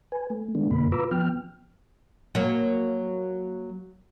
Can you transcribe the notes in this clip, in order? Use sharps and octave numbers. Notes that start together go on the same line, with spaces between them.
B4 G#5
A3
D#3 G#3 A3 B3 D4
F#2 B2 D3 A#3 B5
F4 B4 A#5 B5 D6 E6
F3 B3 G5 F6
F#3 A#3